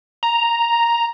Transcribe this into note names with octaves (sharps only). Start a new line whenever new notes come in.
A#5